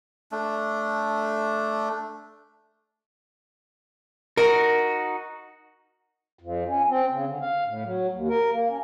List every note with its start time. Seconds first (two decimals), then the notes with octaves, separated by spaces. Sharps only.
0.32 A3 D4
4.37 D#4 F#4 A#4
6.39 F2
6.68 C#4
6.89 C4
7.11 C#3
7.27 D3
7.41 F5
7.66 A2
7.84 F#3
8.12 D#2
8.28 A#4
8.52 A#3
8.68 C#4